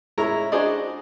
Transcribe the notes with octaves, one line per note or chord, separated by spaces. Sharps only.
G#3 E4 A#4 C#5 A#5
D4 F#4 G#4 C5 D5 D#5